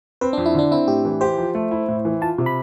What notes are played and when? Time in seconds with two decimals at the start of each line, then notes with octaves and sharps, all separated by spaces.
0.21 C4 B4
0.33 D4
0.37 F2
0.46 E4
0.55 D3 D4
0.71 C4 E4
0.87 A2 G4
1.05 E3
1.21 G4 C5
1.37 F3
1.55 A3
1.71 E4
1.88 A2
2.05 E3
2.21 F4 A5
2.38 C3
2.46 B5